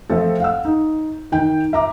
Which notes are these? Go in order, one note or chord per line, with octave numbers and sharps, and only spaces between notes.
F3 A3 C4 A4
F5 F#5 E6
D#4
D#3 G5
E5 A#5 D6